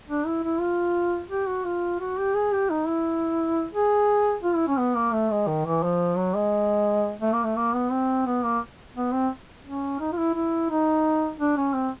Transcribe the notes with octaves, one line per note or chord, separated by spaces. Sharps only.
D4
E4
E4
F4
G4
F#4
F4
F#4
G4
G#4
G4
D#4
E4
G#4
F4
E4
C#4
B3
A#3
A3
G#3
D#3
E3
F3
F#3
G#3
A3
A#3
A3
A#3
B3
C4
B3
A#3
B3
C4
C#4
D#4
F4
E4
E4
D#4
D4
C#4
C4